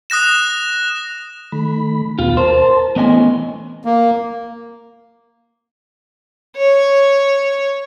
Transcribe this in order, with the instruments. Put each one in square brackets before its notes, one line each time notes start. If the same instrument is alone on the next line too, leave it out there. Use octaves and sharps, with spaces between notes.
[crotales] D#6 F#6 A#6 E7
[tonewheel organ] D#3 A3 B5
[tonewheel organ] D#2 B2 B3 [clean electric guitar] F4
[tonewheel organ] A#4 A5 [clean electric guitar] C5
[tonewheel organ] E3 A3 C#4 [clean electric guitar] B3 D#5 G#5
[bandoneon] A#3
[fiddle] C#5